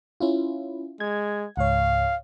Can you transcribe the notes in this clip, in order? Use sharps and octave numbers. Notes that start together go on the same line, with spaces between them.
C#4 E4 F4
G#3 G#6
C#2 G#2 C#5 F5